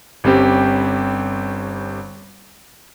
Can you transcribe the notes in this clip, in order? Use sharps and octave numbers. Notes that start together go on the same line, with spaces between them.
G1 G3 C4 C#4 G4